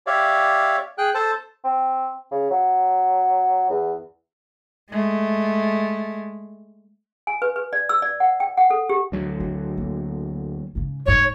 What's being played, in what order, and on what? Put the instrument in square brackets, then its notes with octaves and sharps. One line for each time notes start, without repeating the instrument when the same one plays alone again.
[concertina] G4 C#5 D5 E5 F5
G#4 G5 F#6
A4 C5 A5
[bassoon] C4
C#3
F#3
E2
[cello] G#3 A3
[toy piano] G#5
B4
B4
D5
E6
D5
F#5
G5
F#5
A4
G4
[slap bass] D2 F#3
[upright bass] C4
A#3
G#2 C#3
[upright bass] F1 G#2 [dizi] C#5